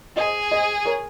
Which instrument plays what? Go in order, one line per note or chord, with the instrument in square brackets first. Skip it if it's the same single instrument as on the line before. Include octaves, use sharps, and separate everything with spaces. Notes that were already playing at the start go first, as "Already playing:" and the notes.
[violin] G#4 [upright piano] C5 D#5
[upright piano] C5 D#5
A#4 C#5